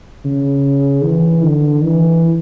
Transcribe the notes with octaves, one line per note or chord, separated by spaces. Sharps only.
C#3
E3
D3
E3